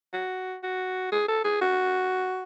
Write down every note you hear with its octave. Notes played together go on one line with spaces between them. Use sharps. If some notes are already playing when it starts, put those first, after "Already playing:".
F#4
F#4
G#4
A4
G#4
F#4